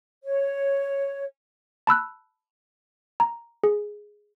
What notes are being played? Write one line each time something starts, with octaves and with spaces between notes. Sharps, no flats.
C#5
A5 B5 E6 F#6
A#5
G#4